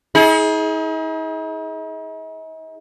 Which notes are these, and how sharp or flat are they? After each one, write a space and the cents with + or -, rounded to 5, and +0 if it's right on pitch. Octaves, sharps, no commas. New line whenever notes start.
D#4 +45 G#4 +20